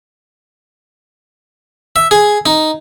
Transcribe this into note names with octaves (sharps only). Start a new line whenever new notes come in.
E5
G#4
D#4